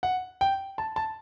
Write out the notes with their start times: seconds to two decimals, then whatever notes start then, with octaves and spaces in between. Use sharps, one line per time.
0.03 F#5
0.41 G5
0.78 A5
0.96 A5